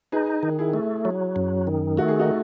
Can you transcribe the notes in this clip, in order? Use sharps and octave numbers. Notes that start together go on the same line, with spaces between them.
D#4 G#4 B4
D#3
E4 G#4
A3
F#3
F#2
D#3
A3 F#4
G#4
D#4 F#4